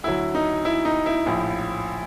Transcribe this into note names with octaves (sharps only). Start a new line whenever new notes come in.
D2 D3 F#3 E4
D#4
E4
D#4
E4
A#1 A2 F3